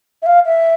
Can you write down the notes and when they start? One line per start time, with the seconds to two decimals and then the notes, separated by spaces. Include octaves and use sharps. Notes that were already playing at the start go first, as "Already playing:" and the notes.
0.22 E5
0.26 F5
0.45 E5